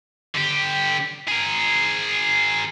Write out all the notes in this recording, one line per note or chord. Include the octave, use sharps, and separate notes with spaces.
D3 G4
G#4 A#4